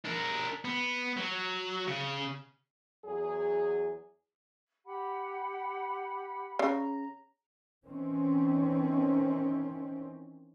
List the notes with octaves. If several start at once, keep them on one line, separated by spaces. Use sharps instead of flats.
D4 A#4
B3
F#3
C#3
E2 F#3 G#4
G4 F#5 B5
C#3 A#5
D#3 E3 C4 C#4